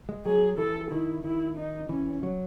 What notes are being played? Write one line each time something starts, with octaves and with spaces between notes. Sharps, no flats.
G#3
F#3 G#4
E3 A4
D#3 E4
D#3 E4
D#4
E3 C#4
F#3